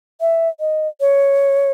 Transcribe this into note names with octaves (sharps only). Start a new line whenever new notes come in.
E5
D#5
C#5